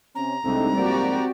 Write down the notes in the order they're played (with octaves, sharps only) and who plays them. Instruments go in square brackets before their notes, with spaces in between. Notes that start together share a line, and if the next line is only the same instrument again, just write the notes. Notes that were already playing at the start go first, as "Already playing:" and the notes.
[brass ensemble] C3 C#4 [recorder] A#5
[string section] C2 D3 [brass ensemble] G#3 A3 D#4 [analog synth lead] C4
[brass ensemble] G#2 F3 A#3 [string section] F#4 G4 D5